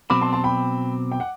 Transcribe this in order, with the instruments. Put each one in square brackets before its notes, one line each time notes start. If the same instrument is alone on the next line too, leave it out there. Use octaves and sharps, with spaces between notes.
[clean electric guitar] B2 F#3 C4 [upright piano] B5 D6
[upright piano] A5 C6
A5 C6
G5 B5
G5
F#5